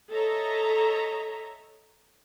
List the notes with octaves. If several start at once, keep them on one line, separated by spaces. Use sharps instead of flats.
A4 C#5 D#5 E5 A#5